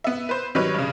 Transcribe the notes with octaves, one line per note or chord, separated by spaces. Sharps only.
B3 E5
B4 C5
D#3 F#3 G3 B4 C#5
G2 C#3